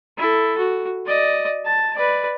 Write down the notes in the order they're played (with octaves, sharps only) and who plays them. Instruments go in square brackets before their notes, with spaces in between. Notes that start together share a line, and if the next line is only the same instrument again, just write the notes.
[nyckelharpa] E4 A4
F#4
D5 D#5
A5
B4 D5